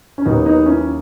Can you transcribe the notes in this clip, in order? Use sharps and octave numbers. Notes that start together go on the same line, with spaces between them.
C#4
D#2 D#3 F#3 B3 D#4
B3 D#4
C#4 E4